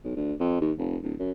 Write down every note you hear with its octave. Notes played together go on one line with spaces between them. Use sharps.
B1
D2
F2
D#2
F1
D1
F#2